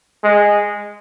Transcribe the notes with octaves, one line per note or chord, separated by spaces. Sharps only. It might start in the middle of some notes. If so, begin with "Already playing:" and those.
G#3